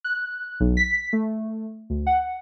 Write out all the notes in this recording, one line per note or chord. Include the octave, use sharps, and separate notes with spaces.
F#6
B1
B6
A3
D2
F#5